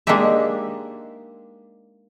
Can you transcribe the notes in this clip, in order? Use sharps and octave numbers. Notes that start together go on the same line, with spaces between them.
G#3 A#3 D4 D#4 G4 E5